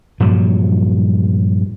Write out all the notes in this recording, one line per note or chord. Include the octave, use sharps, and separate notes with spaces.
G2 A#2 F3 F#3